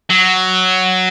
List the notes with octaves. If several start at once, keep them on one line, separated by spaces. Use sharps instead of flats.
F#3